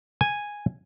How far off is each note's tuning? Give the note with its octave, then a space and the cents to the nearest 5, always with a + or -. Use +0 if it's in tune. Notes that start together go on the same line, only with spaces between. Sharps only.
G#5 -5